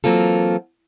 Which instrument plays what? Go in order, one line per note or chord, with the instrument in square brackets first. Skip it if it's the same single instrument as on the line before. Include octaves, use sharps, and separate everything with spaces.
[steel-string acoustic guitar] E3 F#3 A#3 C4 F4 A4